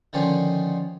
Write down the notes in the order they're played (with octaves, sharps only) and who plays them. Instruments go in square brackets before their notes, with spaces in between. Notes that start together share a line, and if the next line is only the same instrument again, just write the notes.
[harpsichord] D3 D#3 F3 C#4 F4